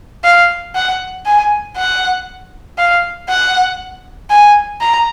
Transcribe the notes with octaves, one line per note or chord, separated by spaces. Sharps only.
F5
F#5
G#5
F#5
F5
F#5
G#5
A#5